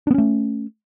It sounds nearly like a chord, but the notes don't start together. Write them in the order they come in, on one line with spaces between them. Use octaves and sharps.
D4 B3 C#4 A3